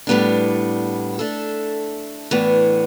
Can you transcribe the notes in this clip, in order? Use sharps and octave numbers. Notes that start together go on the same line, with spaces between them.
A2 G3 B3 D4
A3 D4 A4
A2 E3 B3 D4